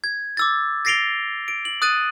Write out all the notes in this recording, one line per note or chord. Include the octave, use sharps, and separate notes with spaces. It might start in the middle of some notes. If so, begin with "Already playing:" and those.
G#6
D6 E6 A6
A6 A#6 C7 D7 F7 G7
D7
F#7
D#6 F#6 A6 D#7